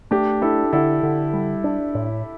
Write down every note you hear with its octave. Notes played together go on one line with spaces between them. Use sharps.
A3 D4 G4
D4 E4 A4
D3 E4 A4
D3
G3
D4
A2